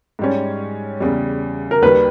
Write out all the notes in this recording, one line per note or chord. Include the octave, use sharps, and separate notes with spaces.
G#2 G3 C#4
E2 C#3 G3
A#4
D#2 D#3 G3 B4